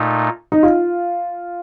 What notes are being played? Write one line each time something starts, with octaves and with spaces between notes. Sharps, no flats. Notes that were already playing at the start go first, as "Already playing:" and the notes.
Already playing: A#2 A3 D#4
D#4
F4